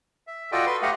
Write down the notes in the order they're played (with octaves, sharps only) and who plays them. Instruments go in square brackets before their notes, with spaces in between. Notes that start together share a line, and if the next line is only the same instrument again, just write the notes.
[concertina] E5
F4 F#4 A4 D5 D#5 G5
B4 C6
A3 G4 D#5 F5 F#5